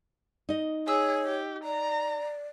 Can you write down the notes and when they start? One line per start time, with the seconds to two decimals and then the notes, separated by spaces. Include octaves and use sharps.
0.49 D#4 D#5
0.88 G#4 C#5 E6
1.25 G4
1.64 D5 A#5